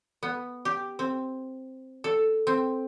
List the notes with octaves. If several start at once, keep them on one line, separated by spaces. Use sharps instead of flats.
B3
G4
C4
A4
C4